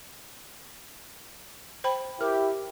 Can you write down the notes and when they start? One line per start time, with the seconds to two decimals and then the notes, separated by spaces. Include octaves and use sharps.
1.84 C5 G5 B5
2.21 E4 G4 A#4